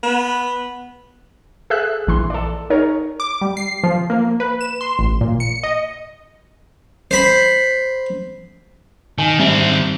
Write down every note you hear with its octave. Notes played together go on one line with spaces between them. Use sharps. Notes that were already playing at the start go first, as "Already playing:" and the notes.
B3
G#4 A4 E5 E6 F#6
A#1 E3 C6
A4 D5
D#4 G#4 A#4 C#5
D6
G3
C7
F3
A#3
B4
E7
C6
A1
A#2
C#7
D#5
C5 B5
D#3 G#5
G2 D#3 C4 E5 G7